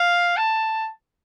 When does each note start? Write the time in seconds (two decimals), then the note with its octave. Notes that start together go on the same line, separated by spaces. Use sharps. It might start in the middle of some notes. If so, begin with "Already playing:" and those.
Already playing: F5
0.37 A5